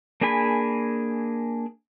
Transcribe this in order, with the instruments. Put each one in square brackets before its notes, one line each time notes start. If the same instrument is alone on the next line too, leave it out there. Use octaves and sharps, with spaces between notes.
[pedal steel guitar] A#3 D4 G#4 G#5 B5